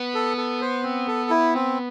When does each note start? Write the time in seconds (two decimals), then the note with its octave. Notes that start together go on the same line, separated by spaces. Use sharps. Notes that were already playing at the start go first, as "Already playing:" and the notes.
Already playing: B3
0.15 A4
0.37 A4
0.61 C5
0.83 C4
1.07 A4
1.30 E4
1.54 C4